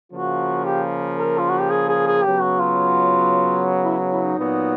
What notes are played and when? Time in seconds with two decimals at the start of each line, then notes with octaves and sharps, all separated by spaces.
0.12 C#3 F3 A#3 F#4
0.65 G4
1.18 A#4
1.39 F4
1.50 F#4
1.60 G4
1.71 G#4
1.89 G#4
2.07 G#4
2.24 C#3 F#3 B3 G4
2.42 F#4
2.60 F4
3.84 E4
4.11 E4
4.24 D#4
4.37 A#2 F#3 B3